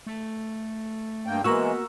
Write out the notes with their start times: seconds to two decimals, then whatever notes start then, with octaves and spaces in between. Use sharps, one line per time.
0.06 A3
1.26 G2 A#3 G5
1.44 E3 G#3 A#3 B3 F#4 A#5 C#6 E6